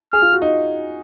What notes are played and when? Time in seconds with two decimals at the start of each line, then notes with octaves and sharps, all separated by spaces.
0.13 G#4 F6
0.22 F4
0.33 F#4
0.42 D#4